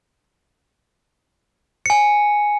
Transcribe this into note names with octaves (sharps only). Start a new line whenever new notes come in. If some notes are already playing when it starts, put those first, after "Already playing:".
G#5 C#7